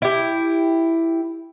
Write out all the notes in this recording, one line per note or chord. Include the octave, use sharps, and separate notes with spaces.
E4 G4